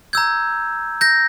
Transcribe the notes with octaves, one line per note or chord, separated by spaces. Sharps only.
A#5 E6 G6 G#6
G6 A#6